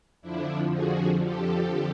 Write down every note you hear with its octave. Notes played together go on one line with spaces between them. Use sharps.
F2 D3 F3 D4 E4
F#4 G#4
G4 A4